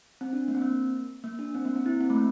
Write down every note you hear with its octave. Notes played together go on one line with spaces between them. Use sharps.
C4
D4
A#3
C4
A#3
A#3
D4
C4
A#3
C4
E4
C4
A3
A#3